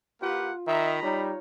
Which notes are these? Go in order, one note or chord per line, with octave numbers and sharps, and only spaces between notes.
A#3 F4 G4 B4 F#5
D#3 D#5 E5 A#5 B5
G3 D#4 C#5